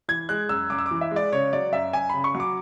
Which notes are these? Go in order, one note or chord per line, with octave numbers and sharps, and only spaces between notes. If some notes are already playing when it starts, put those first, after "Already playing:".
E3 G#6
G#3 F#6
F#2 E6
F#2 D6
E6
D6
E3
E5
G#3
D5
C#3 C#5
F#3 D5
F#2 E5
F#2 G#5
C#3 B5
C#6
F#3
D6